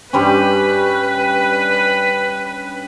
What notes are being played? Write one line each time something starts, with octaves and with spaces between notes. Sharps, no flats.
G2 G3 C#4 B4